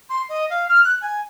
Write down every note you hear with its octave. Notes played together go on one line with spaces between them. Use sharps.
C6
D#5
F5
F6
F#6
G#5